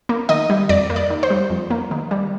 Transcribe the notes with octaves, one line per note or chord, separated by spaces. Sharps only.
A#3
D#3 D#5
G3
F2 D5
A#3
D5
D#3
C5
G3
F2
A#3
D#3
G3